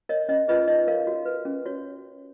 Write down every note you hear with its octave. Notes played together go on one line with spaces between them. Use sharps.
A#4 C#5 D#5
C#4 D#5
F4 G#4 B4 D#5
D#4 D#5
A#4 C#5 F5
F#4
B4
C#4
F#4 C#5